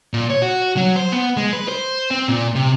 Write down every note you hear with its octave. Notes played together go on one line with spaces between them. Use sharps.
A#2
C#5
F#4
F#3
C5
B3
G#3
B4
C5
C4
A#2
C3